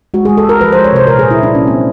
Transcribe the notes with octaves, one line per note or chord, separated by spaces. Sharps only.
G#3 F#4
G#3 G#4
A4
G#3 A#4
F3 B4
G#3 C5
C#5
C3 C5
A#2 A#4
A#2 G#4
E4
F#3 D4
A#3 C#4
A#3 C4